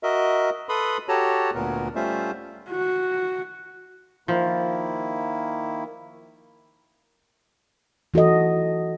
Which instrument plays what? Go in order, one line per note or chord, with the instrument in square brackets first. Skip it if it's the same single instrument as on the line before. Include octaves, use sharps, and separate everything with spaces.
[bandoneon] F#4 A#4 D#5 E5
A4 B4 B5 C6 D#6
F#4 G4 A4 C#5 A5 A#5
D2 A#2 B3 A#4
G3 A3 C#4 F4 C5 E5
[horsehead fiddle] F#4
[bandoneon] D#3 A#3 E4 [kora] F3
[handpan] E3 F#4 A4 D#5